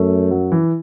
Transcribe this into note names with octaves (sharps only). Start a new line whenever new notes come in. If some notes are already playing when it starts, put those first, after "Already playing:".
Already playing: F#2 A3
F#3
E3